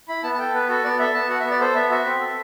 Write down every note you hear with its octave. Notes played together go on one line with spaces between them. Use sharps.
E4 B5
B3 A5
A5
A4 G5
B3 B4
F#4 A4
B3 D5
A4 E5
B3 A5
F#4 F#5
E5
B3
D5
A4 C5
B3 E5
F#4 E5
C4
A4